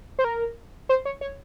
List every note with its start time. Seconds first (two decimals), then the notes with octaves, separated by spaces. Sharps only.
0.19 C5
0.24 A#4
0.89 C5
1.05 C#5
1.21 C#5